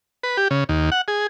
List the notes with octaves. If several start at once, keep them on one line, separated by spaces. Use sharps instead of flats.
B4
G4
C#3
D#2
F#5
G#4